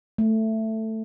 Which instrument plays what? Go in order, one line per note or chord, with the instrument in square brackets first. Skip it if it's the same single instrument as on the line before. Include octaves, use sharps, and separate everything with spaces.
[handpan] A3